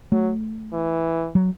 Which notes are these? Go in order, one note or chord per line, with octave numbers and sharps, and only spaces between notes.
F#3 A3
E3
F#3